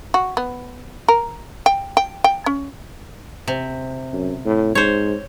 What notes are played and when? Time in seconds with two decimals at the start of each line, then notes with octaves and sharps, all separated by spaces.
0.14 F#4
0.37 B3
1.08 A#4
1.66 G5
1.97 G5
2.24 G5
2.46 C#4
3.48 C3
4.13 F#2
4.46 A2
4.75 G#2 C5 C#5